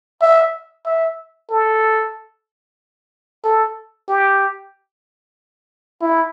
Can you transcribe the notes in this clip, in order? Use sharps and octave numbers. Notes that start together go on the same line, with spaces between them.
E5
E5
A4
A4
G4
E4